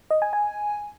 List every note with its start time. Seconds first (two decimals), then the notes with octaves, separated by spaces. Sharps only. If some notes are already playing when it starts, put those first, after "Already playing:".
0.11 D#5
0.22 G#5
0.33 G#5